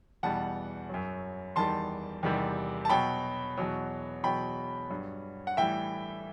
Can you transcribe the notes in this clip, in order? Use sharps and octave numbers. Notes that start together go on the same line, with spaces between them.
E2 B2 G3 F#5 A5
F#2 F#3
E2 D#3 G3 A5 C6
E2 C3 D#3 G3
A5
B2 F#3 G5 B5
E2 B2 F#3
E2 B2 F#3 G5 B5
G2 F#3
F#5
A2 E3 G3 E5 G5